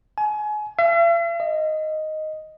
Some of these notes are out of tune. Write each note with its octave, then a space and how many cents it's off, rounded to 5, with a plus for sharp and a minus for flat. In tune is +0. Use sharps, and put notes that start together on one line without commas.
G#5 +30
E5 +45
D#5 +0